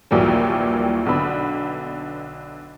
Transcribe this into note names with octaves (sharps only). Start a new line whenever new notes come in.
A#1 D#2 A#2 E3 F#3 G3
B1 D3 B3 B5